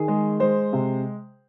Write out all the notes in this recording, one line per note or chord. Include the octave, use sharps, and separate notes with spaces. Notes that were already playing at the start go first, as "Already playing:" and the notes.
Already playing: D#3 G#4
G#3
G#3 C5
C3